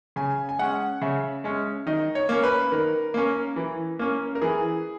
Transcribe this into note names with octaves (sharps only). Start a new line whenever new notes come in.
C#3 G#5
G#5
G#3 C#4 F#5
C#3 E5
G#3 C#4
D#3 D#5
C#5
A#3 C#4
B4
D#3 A#4
A#3 C#4
E3
A#3 C#4
A#4
E3 G#4